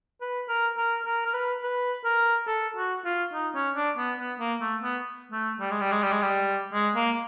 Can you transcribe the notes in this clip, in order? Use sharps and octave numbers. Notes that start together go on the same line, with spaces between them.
B4
A#4
A#4
A#4
A#4
B4
B4
A#4
A4
F#4
F4
D#4
C#4
D4
B3
B3
A#3
A3
B3
A3
G3
G#3
G3
G#3
G3
G#3
G3
G#3
A#3